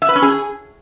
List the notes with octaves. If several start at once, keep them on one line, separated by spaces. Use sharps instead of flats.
E5
B4
C#4
G#4